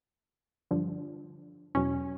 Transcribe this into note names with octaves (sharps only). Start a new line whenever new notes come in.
G2 D3 F3
E2 B2 F#3 C#4